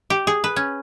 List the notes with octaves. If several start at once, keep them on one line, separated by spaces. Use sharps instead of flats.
G4
G#4
B4
C#4